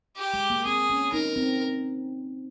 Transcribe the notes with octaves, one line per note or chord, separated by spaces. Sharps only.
G4
G#3
A#3
C4 G#4
C#4
D#4 A#4
C4